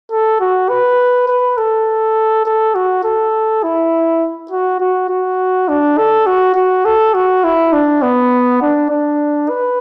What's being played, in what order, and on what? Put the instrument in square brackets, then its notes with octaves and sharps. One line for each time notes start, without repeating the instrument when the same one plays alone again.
[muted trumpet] A4
F#4
B4
B4
A4
A4
F#4
A4
E4
F#4
F#4
F#4
D4
A4
F#4
F#4
A4
F#4
E4
D4
B3
D4
D4
B4